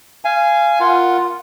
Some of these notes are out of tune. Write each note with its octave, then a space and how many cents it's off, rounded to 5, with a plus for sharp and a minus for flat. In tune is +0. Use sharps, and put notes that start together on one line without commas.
F5 -20 G#5 +0
F4 +0 A#4 +0 F#5 +0